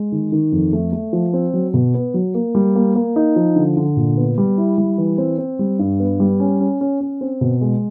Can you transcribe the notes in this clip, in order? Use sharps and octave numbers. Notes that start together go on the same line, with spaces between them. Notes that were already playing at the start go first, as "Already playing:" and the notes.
Already playing: G#3
D#3
D#3
F2
A3
A3
F3
C4
F#3
B2
B3
F#3
A#3
G3
A#3
A#3
D#4
F3
D3
D3
A#2
B3
G3
E4
G3
E3
C4
C4
G3
G2
B3
G3
C#4
C#4
C#4
C#4
C4
B2
G#3